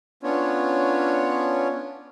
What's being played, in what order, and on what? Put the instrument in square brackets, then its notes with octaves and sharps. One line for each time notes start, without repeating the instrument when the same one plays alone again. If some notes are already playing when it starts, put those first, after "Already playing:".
[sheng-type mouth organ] B3 C#4 D4 F4 C#5